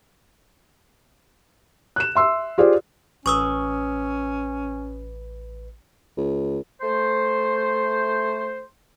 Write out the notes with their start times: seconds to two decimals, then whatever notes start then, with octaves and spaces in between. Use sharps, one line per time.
1.96 F#6 E7
2.15 E5 C6 E6
2.58 F4 G4 G#4 C5 D5
3.26 A1 C#4 B4 C#6 D#6 E6
6.17 C#2
6.81 A3 C5